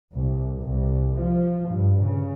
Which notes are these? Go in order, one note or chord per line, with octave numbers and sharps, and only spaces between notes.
C2
C2
F3
G2
C#3